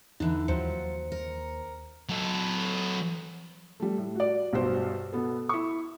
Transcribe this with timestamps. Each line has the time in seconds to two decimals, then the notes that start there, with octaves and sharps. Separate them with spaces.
0.20 E2 D3 E3 D#4
0.48 D#2 F3 F#3 C5 C#7
1.12 A#4
2.09 F#3 A4
3.80 G3 A3
3.98 A2
4.15 F#4 D5
4.53 B1 G2 F#4 C5
5.13 B2 B3 A4
5.49 E4 C#6